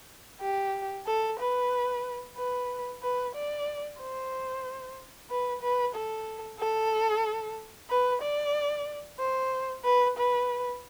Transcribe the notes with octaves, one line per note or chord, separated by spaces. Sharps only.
G4
A4
B4
B4
B4
D5
C5
B4
B4
A4
A4
B4
D5
C5
B4
B4